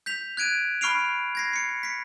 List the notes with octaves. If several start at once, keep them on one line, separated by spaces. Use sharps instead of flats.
G6 B6 F7
F#6 G#6 D7 D#7
B5 C#6 F6 C7 D7 F7
G#6 A#6 C7
C7 C#7
B6 C#7